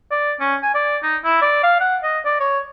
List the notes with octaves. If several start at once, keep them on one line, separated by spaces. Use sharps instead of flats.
D5
C#4
G#5
D5
D#4
E4
D5
F5
F#5
D#5
D5
C#5